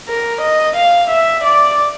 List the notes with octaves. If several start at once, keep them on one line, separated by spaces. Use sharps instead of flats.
A#4
D#5
F5
E5
D5